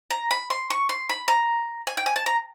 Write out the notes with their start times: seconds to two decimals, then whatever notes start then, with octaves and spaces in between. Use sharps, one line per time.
0.11 A#5
0.31 B5
0.50 C6
0.70 C#6
0.89 C6
1.09 B5
1.28 A#5
1.87 G#5
1.97 G5
2.06 G#5
2.16 A5
2.26 A#5